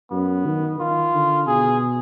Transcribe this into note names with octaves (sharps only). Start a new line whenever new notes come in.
F#2 B3
D#3
D#3 F4
D3
B2 G#4